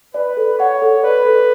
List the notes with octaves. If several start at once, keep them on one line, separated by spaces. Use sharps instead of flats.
B4 D5
A4
C#5 F#5
A4
B4 D5
A4